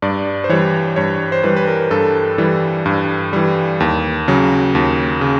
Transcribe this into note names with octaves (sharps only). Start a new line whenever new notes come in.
G2 D5
C5
E3 G3 C#5
G2 C#5
C5
E3 G3 B4
B4
A#4
G2 A4
E3 G3
G2
E3 G3
D#2
C#3 F#3
D#2
C#3